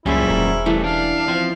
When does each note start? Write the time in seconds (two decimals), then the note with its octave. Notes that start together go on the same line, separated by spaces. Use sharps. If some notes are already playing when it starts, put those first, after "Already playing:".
0.06 C#2 F#2 A#2 G3 C#4 E4 G#4 C5
0.30 E1 A#4
0.66 E3 G3 A3 G4
0.84 D4 F5
1.28 F3 C4